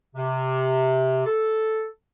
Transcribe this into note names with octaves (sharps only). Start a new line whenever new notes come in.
C3
A4